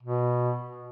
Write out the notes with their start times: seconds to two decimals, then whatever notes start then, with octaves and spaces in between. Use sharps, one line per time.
0.03 B2